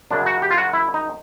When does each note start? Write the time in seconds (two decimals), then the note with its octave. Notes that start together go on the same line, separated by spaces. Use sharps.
0.11 F#2 C#3 F#3 D4
0.26 F#4
0.42 G4
0.51 F4
0.58 F#4
0.73 E4
0.94 D#4